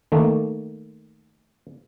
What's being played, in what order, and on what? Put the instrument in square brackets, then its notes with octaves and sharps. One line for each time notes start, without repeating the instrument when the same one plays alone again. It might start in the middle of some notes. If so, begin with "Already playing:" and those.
[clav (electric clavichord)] D#3 A3 A#3